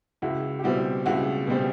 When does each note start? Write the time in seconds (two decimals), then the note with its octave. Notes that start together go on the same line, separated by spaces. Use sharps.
0.22 C#2 E4 F#4
0.59 G4
0.64 B2 G3 C4 E4 F#4
1.06 C#2 E4 F#4
1.47 B2 G3 C4